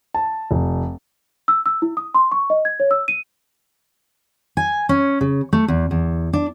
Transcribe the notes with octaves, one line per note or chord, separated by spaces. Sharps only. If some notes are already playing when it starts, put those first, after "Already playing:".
A5
F1
E6
E6
E4
D#6
C6
C#6
D#5
G#6
C#5
E6
D#7
G#5
C#4
C#3
A3
E2
E2
D4